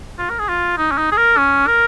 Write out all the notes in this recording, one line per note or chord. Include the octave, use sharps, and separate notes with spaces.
F4
A#4
G#4
F4
D#4
C#4
D#4
G#4
A#4
C#4
A#4